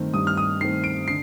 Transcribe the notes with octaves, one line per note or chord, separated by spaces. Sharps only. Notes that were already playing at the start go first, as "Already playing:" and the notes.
Already playing: G2 D#3 A3 C4
G2 D#6
F6
D#6
D#3 A3 C4 C7
D7
D3 C7